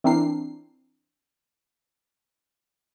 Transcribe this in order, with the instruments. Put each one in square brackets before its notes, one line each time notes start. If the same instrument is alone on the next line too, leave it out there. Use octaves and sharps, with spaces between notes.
[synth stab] E3 C4 D4 A#4 C7